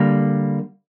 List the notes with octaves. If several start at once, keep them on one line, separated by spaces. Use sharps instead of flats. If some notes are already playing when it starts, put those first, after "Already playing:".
Already playing: D3 G3 A#3